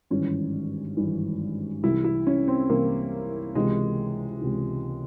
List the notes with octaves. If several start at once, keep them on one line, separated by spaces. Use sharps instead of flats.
G#1 G2 E3 C#4
G#1 G2 E3
C2 C3 E3 E4
E4
C#4
C4
C2 C3 E3 A#3
C#2 C3 E3 G#3
C#2 C3 E3